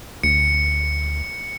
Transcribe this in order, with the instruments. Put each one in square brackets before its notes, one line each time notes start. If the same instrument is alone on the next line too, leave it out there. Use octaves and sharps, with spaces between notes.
[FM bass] D2 [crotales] C#7